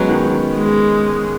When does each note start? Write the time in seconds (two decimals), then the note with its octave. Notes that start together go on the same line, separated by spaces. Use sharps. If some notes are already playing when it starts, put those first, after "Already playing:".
Already playing: F#3 G#3 B3 C#4
0.09 D#3
0.57 G#3